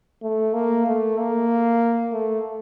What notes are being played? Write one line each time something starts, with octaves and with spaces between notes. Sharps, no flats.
A3
A#3
A3
A#3
A3